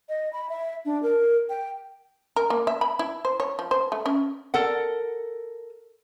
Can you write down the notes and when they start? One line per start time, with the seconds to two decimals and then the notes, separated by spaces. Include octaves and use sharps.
0.09 D#5
0.33 B5
0.49 E5
0.85 D4
1.02 A#4
1.49 G5
2.36 A#4
2.50 A#3
2.67 E5
2.81 B5
2.99 E4
3.25 C5
3.40 C#5
3.59 F3
3.71 C5
3.92 A3
4.06 C#4
4.54 A4 A#4 F#5